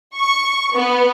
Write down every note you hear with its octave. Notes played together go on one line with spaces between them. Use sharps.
C#6
B3